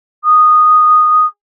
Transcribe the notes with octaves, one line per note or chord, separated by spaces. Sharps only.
D#6